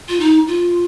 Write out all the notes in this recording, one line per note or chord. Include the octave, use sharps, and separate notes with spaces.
F4
D#4
F4